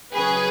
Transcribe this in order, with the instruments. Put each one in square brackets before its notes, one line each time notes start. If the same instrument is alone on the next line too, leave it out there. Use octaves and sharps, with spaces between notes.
[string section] C#3 F#3 C#4 G#4 B4